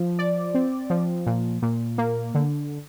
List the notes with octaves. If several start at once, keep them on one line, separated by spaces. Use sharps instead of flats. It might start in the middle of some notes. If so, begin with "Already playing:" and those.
Already playing: F3
D5
C4
F3
A#2
A#2
A#3
D3